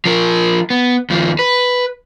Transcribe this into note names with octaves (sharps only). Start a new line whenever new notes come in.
F3 A#4
B3
D#2 F3
B4